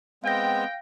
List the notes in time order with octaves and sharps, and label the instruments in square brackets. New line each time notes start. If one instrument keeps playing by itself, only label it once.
[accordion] G#3 B3 C4 [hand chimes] F5 A#6 [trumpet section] G5